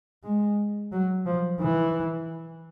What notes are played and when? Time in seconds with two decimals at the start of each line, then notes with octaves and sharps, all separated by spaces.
0.24 G#3
0.92 F#3
1.26 F3
1.60 E3